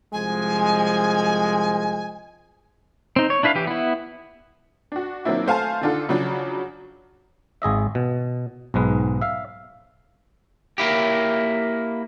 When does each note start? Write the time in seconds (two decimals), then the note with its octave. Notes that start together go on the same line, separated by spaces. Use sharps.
0.13 C2 F3 G#3 G#5
3.16 C4 D#4
3.30 C#5
3.43 D4 E4 B4 E5 F5
3.55 E3 G4
3.67 B3 E4
4.92 D4 F#4
5.25 D#3 F#3 A#3 C4 D4 E4
5.47 A3 C5 F5 G#5 A5
5.81 D3 D#3 D4 F4 A4
6.09 C#3 F3 F#3 D4
7.62 G#1 G#4 D#5 E5
7.95 B2
8.74 B1 G#2 G#3 B4
9.21 E5 F5
10.78 A#3 E4 G4